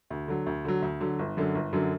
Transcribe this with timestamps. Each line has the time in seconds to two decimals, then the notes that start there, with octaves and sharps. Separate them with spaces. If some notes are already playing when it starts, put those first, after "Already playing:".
0.10 D2
0.28 D3 F#3
0.46 D2
0.65 D3 F#3
0.82 D2
1.01 D3 F#3
1.19 G1
1.37 F#2 D3 F#3
1.55 G1
1.73 F#2 D3 F#3